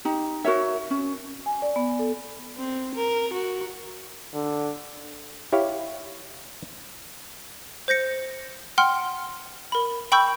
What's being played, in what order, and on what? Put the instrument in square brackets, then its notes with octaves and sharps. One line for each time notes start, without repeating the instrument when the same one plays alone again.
[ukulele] D#4 G4
F#4 A#4 C#5 E5
C#4
[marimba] G#5
D5
B3
A4
[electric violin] C4
A#4
F#4
[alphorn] D3
[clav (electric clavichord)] E4 G4 C#5 F5
[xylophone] C5 G6 A#6 C#7
F#5 G5 C6 F6
A#4 B5
G5 B5 C#6 E6 G6